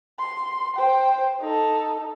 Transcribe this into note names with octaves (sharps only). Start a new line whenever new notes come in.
C6
C5 G5
D#4 A4